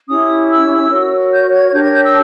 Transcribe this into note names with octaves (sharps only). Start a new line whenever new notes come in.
C#4 E4 G4 D#6
E6
F#4 A#4 C#5
G6
G#6
G#6
D4 G4 A#4 C#5 G6
G#6
G6
E6